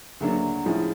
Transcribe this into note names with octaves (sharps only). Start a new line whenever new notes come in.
D2 C#3 F#3 A#3 D4
A2 F3 G#3 C#4